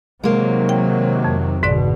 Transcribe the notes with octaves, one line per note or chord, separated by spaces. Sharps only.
C3 D#3 F#3 G#3 A#3
G5
F2
G#1 G#2 B2 D3 D5